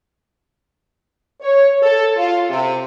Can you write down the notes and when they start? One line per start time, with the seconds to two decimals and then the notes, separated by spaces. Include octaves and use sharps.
1.41 C#5
1.83 A4
2.16 F4
2.50 C3